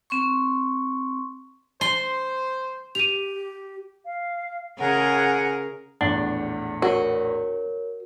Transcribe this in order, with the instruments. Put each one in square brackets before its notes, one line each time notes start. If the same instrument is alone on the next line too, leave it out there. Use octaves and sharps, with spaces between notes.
[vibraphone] C4 C6 C#6
[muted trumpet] C5 [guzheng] C6
[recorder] G4 [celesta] D#7 F7
[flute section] F5
[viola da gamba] C#3 G#4 A#4 [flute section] F#5 G#5
[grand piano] A#1 E2 A2 [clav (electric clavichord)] D4 [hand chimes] F#5
[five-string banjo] F#4 [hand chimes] A#4 C#5